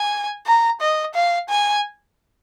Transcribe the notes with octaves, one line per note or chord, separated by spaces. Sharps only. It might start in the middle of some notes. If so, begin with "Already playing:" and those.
Already playing: G#5
A#5
D#5
F5
G#5